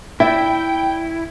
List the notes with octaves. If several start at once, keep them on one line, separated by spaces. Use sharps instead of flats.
E4 D5 E5 G5